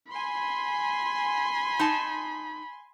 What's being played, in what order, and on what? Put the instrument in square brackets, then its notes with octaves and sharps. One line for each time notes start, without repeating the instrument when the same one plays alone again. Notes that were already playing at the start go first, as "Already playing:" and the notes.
[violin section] G#5 C6 [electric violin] B5
[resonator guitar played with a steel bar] D#4 A5